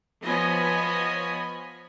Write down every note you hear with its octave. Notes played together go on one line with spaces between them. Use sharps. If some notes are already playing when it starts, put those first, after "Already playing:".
F3 B3 C#5 D#5 G#5 B5